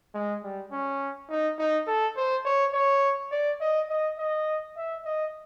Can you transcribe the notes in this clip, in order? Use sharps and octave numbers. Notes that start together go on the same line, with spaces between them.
G#3
G3
C#4
D#4
D#4
A4
C5
C#5
C#5
D5
D#5
D#5
D#5
E5
D#5